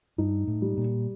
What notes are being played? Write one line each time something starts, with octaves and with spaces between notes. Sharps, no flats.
G2 D#4
A2
G3
A#2